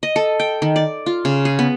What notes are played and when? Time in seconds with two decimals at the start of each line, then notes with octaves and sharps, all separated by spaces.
0.03 D#5
0.16 A4
0.40 G5
0.62 D#3
0.76 D5
1.06 F4
1.25 C#3
1.45 G#4
1.59 B3